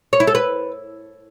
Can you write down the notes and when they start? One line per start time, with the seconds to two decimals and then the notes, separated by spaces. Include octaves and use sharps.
0.13 C#5
0.20 E4
0.27 A4
0.35 B4